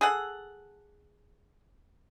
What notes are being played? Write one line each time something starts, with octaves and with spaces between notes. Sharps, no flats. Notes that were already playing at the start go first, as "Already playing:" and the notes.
G#4 A4 F#5